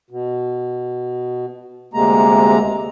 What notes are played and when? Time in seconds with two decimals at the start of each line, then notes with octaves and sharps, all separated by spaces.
0.10 B2
1.94 D2 C3 G#3 A#3 A#5